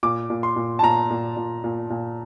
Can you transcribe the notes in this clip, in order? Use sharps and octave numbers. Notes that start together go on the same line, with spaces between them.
A#2 D6
A#2
C6
A#2
A5
A#2 A#5
A#2
A#2
A#2
A#2